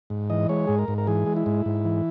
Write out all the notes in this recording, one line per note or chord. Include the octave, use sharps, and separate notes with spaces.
G#2
E3 D#5
G#3 C#5
G#2 G#4
A#4
G#2
A#4
E3 G#4
G#3
E4
G#2
G#2
E3